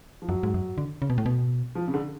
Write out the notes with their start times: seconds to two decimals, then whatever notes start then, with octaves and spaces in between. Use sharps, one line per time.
0.22 F3
0.29 F#2 F#3
0.43 G#2
0.54 F#2
0.78 D3
1.02 C#3
1.10 B2
1.18 A2
1.26 B2
1.75 F3
1.87 C#3
1.94 D3